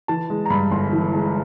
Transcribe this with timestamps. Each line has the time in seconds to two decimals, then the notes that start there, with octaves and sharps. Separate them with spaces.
0.08 E3 A5
0.30 G#3
0.46 A#5
0.50 G2 B5
0.71 G1 C6
0.93 E3
1.14 G#3